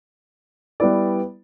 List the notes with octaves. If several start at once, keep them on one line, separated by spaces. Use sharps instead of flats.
G3 B3 E4 B4 D5